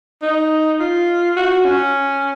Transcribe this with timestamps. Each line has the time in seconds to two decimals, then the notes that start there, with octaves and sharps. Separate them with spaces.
0.22 D#4
0.80 F4
1.36 F#4
1.65 C#4